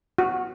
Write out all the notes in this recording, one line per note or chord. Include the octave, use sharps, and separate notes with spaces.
F#4